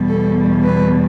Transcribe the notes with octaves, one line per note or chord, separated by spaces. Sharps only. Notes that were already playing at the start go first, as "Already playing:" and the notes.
Already playing: E2 B2 G3
A4
B4